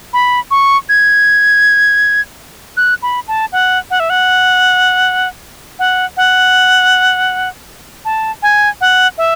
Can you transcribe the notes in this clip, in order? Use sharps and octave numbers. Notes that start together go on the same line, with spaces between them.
B5
C#6
G#6
F#6
B5
A5
F#5
F#5
E5
F#5
F#5
F#5
A5
G#5
F#5
E5